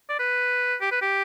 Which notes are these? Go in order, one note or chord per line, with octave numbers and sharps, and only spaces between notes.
D5
B4
G4
B4
G4